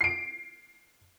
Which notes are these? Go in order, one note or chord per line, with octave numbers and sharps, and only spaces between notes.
C7 D7